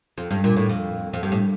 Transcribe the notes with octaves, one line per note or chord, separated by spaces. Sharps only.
F2
G2
A#2
A2
F2
F2
G2
A2